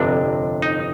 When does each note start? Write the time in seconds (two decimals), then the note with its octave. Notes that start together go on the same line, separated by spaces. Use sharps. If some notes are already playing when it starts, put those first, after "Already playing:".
Already playing: G1 F2 C3 D4
0.62 D#4